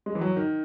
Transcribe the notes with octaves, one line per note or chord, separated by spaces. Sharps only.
G#3
E3
F#3
D#3